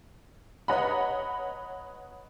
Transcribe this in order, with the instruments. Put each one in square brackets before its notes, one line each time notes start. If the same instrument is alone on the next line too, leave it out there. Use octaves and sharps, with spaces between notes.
[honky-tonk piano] B4 C#5 D#5 F#5 A#5 B5